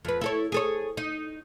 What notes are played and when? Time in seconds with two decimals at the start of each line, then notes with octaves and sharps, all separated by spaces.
0.05 F2 B4
0.21 E4 A4 C#5
0.52 G#4 A4 C#5
0.97 D#4